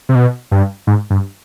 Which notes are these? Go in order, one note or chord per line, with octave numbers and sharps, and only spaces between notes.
C3
B2
G2
G#2
G2